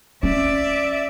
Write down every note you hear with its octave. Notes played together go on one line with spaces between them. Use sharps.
C#4 D5 E5